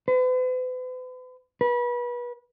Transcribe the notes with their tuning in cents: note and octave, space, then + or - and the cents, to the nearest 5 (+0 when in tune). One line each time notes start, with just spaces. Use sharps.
B4 +45
B4 -30